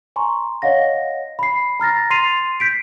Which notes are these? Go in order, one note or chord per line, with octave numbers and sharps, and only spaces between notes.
G#5 A#5 C6 C#6
C#5 D#5 F5 F#5 A#6
B5 C7
A#5 F6 A6 A#6
C6 A6 C7 D#7 F7
G6 B6 C7 D7